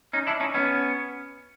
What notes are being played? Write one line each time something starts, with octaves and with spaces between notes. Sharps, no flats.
C#4 D#4
D4 E4
C#4 D#4
B3 C#4